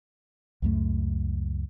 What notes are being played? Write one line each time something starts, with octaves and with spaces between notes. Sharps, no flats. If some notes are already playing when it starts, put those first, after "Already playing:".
C#2 F#2 A3